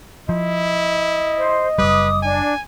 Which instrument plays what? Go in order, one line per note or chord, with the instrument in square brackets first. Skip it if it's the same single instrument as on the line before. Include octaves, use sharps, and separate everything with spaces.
[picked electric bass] F3 [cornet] E4 [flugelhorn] D#5
[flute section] C5
[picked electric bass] F#1 B1 G3 [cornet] B4 [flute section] D6 D#6
[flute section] D4 [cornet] G#5